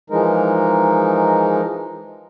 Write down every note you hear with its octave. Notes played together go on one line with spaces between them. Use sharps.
E3 F3 G#3 D#4 A#4